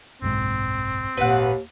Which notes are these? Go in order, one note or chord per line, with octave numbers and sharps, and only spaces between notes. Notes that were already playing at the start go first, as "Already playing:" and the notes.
F#1 B1 G#2 C4
G#1 D#2 A#2 B4 F#5